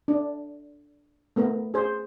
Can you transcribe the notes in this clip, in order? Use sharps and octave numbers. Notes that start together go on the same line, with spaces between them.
D4
A3 B3 A#4
G#4 C5